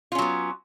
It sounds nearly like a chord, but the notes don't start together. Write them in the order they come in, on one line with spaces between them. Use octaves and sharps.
F4 C#4 F#3 B3